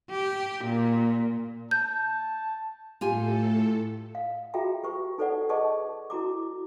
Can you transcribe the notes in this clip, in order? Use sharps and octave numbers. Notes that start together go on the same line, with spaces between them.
G4
A#2
A5 G6
A2 F4 G4 A4 G#5
F5
F4 F#4 G#4 E5 G5 A#5
G4 B4 C#6
D#4 A4 B4 C5 D5 F#5
G#4 B4 D5 D#5 A5 C#6
E4 F#4 A#5 D6